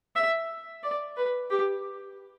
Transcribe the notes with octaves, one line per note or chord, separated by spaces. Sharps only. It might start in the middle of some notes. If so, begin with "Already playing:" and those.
E5
D5
B4
G4